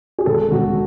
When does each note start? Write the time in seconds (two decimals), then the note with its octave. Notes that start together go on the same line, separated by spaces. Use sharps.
0.18 G#4
0.26 E1 A4
0.51 E1 F#4